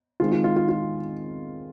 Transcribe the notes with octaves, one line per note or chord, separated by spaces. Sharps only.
D#3 G#3 C4 F4
F4
F4
F4
F4